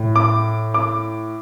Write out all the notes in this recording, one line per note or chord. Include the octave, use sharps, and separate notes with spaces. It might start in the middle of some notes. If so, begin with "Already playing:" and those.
Already playing: A2
D6
D6